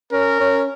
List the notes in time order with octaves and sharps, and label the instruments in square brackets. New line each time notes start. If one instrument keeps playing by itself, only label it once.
[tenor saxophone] C#4 [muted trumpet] A#4
[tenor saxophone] C#4